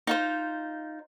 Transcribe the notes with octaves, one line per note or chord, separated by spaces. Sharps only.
D#4 F4 C5